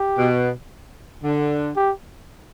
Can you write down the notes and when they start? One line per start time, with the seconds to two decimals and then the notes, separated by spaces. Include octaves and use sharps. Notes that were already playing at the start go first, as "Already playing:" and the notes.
Already playing: G4
0.18 B2
1.23 D3
1.76 G4